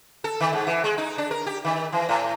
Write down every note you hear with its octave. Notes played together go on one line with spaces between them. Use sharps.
A4
D#3
G#2
E3
G#3
D#4
D4
A#4
G4
D#3
E3
A2